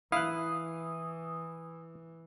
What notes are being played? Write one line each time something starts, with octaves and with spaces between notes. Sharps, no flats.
E3 E4 F5 D#6 F#6